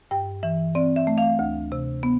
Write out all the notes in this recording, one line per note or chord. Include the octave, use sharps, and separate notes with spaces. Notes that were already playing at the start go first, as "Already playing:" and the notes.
G2 G5
E3 E5
C4 D5
E5
A3
F5
D2
C3
B3